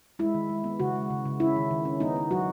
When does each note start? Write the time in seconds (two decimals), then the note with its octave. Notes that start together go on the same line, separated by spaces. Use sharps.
0.19 G#3 E4
0.34 D#3
0.49 G#3
0.64 B3
0.80 C#3 F#4
0.95 G#3
1.10 C#3
1.25 C#3
1.40 C#4 E4
1.56 D#3
1.71 D#3
1.85 C#4
2.00 B3 D#4
2.16 B3
2.31 F#3 F#4